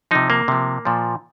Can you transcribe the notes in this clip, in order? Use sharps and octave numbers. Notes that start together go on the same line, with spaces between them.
C3 F3 D#4
A#3
C3 F3
A#2 F3